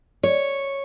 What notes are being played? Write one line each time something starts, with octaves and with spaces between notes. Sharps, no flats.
C#5